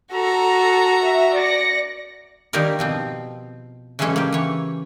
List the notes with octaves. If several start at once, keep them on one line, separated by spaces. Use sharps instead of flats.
F#4 A4 A#5
E5
D5 A#6 C#7
D#3 G3 A#3 D#4 G4 A#4
B2 F3 C4
C#3 E3 F#3 G#3 C#4 A4
A#3 G4
E3 C#5